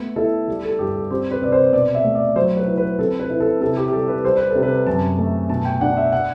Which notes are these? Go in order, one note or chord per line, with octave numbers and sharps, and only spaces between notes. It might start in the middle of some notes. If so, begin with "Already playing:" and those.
Already playing: A3 B3
E4 A4
G3
A4
G2 G4
A4
C4 G4
B4
C3 D5
C5
B2 D5
E5
A3
D5
F#3 C5
B4
E4
B4
C4 A4
B4
E4
A4
C3 A4
G4
G4
G3 A4
B4
G3 C5
B4
A4
C3
B4
F#2 A5
A3
B2 A5
G5
D4 F#5
E5
F#5